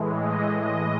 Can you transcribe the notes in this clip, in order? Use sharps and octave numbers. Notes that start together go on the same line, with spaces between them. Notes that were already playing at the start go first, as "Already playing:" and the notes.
Already playing: A2 E3 G#3
D#5
D#5